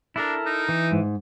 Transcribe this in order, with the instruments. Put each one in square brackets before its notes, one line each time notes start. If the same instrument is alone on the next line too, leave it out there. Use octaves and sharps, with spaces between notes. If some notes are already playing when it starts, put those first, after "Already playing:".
[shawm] D4 [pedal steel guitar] E4 A4 A#4
[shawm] D#4
[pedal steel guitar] E3
[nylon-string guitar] G#2